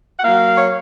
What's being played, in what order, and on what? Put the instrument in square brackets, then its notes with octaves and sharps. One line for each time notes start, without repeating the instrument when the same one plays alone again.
[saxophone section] F#5
F#3 A#3 F5
C#5